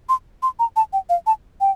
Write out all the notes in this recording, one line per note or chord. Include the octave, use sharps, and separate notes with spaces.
C6
C6
A#5
A5
G5
F5
A5
G5